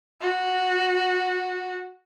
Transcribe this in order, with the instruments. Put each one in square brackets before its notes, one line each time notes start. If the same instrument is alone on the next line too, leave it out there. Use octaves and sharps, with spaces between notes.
[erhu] F#4